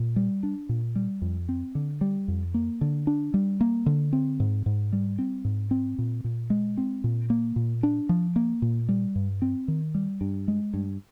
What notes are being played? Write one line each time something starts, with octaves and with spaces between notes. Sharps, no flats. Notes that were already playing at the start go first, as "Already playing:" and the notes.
Already playing: A#2
G3
D4
A#2
G3
F2
C4
D3
G3
F2
A#3
D3
D4
G3
A#3
D3
C4
G#2
G#2
G3
C4
G#2
C4
A#2
A#2
G#3
C4
A#2
A#3
A#2
D4
F3
A#3
A#2
G3
G2
C4
D#3
G3
G2
G#3
G2